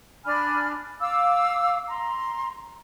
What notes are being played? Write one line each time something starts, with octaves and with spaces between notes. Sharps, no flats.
D4 G#5 B5 F6
F5 D6 E6
A#5 C6